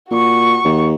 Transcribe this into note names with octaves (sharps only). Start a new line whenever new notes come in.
A#2 F#4 C#6
D#2